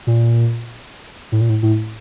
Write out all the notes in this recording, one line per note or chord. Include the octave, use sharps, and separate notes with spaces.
A#2
A2
A#2
A2
A2